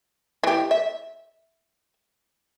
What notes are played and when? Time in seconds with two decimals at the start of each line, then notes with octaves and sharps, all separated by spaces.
0.44 E3 G4
0.71 E5